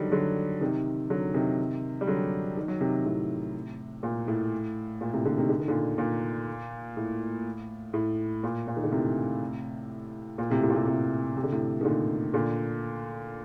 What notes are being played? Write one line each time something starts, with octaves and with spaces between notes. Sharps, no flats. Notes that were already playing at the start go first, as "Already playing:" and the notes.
Already playing: D3 D#3 F#3 G3
D3 F#3
C3 D#3
D3 F#3
C3 D#3
G3
D3 F#3
D#3
F#3
C3 D#3
A2 C3
A#2
A2
A#2
A2 C3
A#2 D3
C3 D#3
D3
D#3
A#2 D3
A#2
A2
A2
A#2
A#2
D#3
D3
A2 C3
A#2
A2 C3
A2 C3
A#2
A2 C3
A2 C3
C3
D3
A2 C3
D#3
A#2 D3
A#2 D3